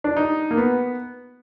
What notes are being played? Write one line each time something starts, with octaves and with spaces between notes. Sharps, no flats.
D4
D#4
A#3
B3